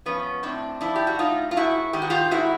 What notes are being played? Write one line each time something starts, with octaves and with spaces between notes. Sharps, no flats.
F3 B3 C#4
A2 C4 D4
F3 D4 E4
G4
F#4
A2 D#4 F4
F4
G#2 E4 F#4
D#3 G4
F#4
F4 G4
G#2 E4 F#4